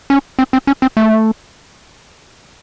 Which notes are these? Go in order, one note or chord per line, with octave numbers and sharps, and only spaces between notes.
C#4
C4
C4
C#4
C4
A3